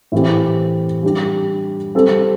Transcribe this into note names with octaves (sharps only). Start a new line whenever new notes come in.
A2 E3 C4 G4
G3 D4 G4
G3 C4 A4